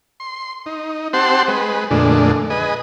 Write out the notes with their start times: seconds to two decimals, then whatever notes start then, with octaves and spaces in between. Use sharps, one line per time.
0.20 C6
0.66 D#4
1.13 C4 G4 C5 F#5 A5 C6
1.48 G#3 B4
1.91 F2 A#2 D3 G#3 A3 D4
2.50 G#4 B4 D#5